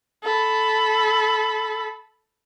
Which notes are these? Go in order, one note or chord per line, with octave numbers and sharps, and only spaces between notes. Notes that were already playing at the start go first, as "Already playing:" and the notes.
A4 B5